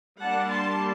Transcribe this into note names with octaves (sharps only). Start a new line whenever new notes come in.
G3 A#3 D4 F#5 A5
A5 C6